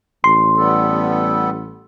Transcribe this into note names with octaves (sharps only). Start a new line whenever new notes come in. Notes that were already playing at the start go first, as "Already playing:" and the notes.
A1 C6
G3 B3 A4